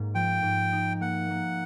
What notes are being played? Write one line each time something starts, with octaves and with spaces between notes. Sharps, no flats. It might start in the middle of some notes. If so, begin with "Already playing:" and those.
Already playing: G#2 A#3
F3 G5
G#2
D#4
A#3 F#5
A#3